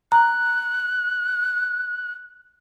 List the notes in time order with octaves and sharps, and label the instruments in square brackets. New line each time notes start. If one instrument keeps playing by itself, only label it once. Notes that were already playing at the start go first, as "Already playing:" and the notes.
[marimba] A#5 [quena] F#6